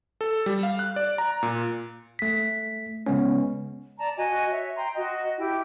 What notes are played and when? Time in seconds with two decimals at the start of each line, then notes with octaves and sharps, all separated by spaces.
0.21 A4
0.46 G3
0.63 F5
0.79 F#6
0.96 D5
1.18 A#5
1.43 A#2
2.19 A3 B6
3.07 C#3 G#3 B3 C#4
3.99 D5 A5 A#5
4.17 F#4 D#5 G#5
4.51 C#5 E5
4.75 G5 A#5 C6
4.96 F#4 D#5
5.38 E4 G4 G5